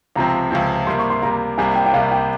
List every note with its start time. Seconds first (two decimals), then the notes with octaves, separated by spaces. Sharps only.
0.16 C#2 C3 F3 C4 A#5
0.51 C#2 C3 F3 C4
0.87 C3 G3 A#3 C6
0.99 C#6
1.10 C6
1.22 C3 G3 A#3 A#5
1.58 C2 C3 G3 A#3 G#5
1.75 G5
1.86 G5
1.93 C2 C3 G3 A#3 F5
2.11 G5